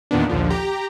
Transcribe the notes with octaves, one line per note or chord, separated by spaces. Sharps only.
E2 A#2 D#3 B3 D4
A#1 D#2 D3 F3
G4 A#5